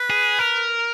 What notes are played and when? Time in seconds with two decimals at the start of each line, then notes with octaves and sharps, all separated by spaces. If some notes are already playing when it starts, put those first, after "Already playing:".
Already playing: B4
0.10 G#4
0.39 A#4